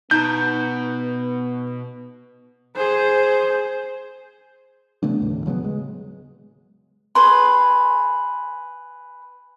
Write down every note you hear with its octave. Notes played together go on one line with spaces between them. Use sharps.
B2 B3 D#4 A#5 G6
G#4 C5
C#3 A3 B3 D4
D#2 A2
C#3 F#3 A3 B3
G#3
G#4 B4 C6